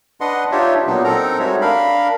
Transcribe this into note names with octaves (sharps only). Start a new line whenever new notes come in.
D4 B4 D#5 F#5 C6
D4 D#4 F4 G4 C#5 E5
A#2 F#3 B3 D4 D#4
C4 D#4 A4 A#4 A#5
G3 G#3 D#4 F#4 C#5 E5
D4 A#4 F5 B5